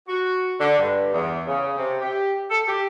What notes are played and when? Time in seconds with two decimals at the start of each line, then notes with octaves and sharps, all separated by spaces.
0.08 F#4
0.60 D3
0.79 G2
1.13 E2
1.47 C#3
1.77 C3
2.01 G4
2.51 A4
2.68 G4